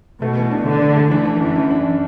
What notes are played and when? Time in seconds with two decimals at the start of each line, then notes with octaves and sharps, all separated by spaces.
0.21 B2 A3
0.37 E3
0.51 D4
0.66 D3 A3
0.82 A3
0.96 A3
1.11 E3 D4
1.26 D4
1.40 F#2
1.56 F#2
1.71 D4